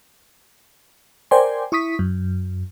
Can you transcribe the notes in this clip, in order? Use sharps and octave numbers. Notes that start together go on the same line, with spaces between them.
A#4 C5 D5 G5 G#5 C6
E4 C#6 D#6 B6
F#2